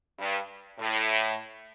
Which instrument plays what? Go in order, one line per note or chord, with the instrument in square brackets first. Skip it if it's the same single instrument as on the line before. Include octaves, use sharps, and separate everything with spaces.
[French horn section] G2
A2